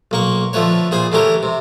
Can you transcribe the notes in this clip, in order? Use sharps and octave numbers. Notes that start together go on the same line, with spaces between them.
B1 A#3 C#6
D3 F3 A3 B4 C#5
A#2 G#4 C5 B5
D3 E3 A3 C#4 G4 A#4
C3